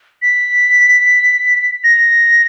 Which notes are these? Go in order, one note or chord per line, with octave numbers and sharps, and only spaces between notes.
B6
A#6